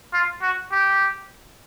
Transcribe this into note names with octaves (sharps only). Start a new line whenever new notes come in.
F4
F#4
G4